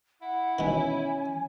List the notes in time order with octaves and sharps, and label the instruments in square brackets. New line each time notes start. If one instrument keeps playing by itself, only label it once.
[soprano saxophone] E4 [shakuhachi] F#5
[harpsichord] B2 D#3 [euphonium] C#4 [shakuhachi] G#5